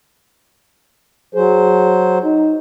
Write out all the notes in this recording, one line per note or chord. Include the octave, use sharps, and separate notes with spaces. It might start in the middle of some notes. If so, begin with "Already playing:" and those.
F#3 G#4 C5
D#4